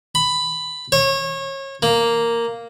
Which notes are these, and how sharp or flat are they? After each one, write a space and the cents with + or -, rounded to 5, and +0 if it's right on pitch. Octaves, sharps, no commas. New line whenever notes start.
B5 +10
C#5 -30
A#3 -5